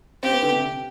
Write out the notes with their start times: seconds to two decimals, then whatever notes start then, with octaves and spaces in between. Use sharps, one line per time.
0.22 C4 G4
0.32 B3
0.43 D3
0.52 C3